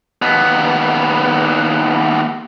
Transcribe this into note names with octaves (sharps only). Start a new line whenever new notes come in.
D#2 B3